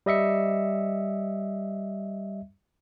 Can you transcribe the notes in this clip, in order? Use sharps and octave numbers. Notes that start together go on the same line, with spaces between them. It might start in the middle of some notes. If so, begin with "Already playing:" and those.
G3 D#5 E5 C#7